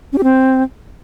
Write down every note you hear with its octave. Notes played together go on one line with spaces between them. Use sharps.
C#4
G4
C4